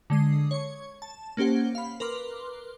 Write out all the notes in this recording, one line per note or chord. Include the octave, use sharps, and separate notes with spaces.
D3 G#3 D#6 C7
C#5 C#6
A5
A#3 C#4 G4 C5 F#5
F5 B5
A#4 B4 C6 D6 F6